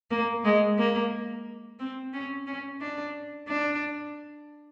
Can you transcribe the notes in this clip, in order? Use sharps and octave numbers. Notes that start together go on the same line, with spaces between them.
A#3
G#3
A#3
C4
C#4
C#4
D4
D4